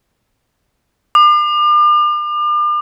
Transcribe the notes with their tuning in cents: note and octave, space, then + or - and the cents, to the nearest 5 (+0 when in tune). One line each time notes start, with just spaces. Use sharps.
D6 +40